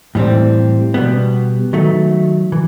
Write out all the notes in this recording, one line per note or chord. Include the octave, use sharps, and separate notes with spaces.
A2 E3 G3 C4
B2 G3 B3
D#3 F#3 A3
E3